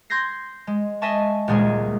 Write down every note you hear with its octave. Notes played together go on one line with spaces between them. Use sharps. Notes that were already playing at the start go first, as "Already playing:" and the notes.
C6 G6 G#6 A#6 C7
G#3
D#5 E5 G#5 A5 C#6
D#1 C#2 A#2 G#3 G#4 G#6